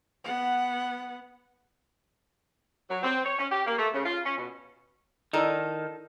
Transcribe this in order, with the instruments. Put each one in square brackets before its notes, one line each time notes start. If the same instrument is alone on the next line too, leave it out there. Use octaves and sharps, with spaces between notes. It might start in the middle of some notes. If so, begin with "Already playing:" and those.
[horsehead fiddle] B3 F#5
[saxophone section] F#3
C4
C#5
C#4
G4
A#3
A3
C#3
F4
C#4
B2
[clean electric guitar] D#3 [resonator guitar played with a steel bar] D#4 A4 [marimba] E4 D5 E6